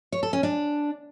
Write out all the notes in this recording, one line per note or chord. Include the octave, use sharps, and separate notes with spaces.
C#5
A4
C#4
D4